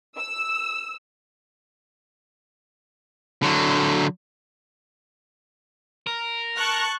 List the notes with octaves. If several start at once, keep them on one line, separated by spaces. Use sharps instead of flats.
E6
D3 F#3
A#4
A5 C#6 F#6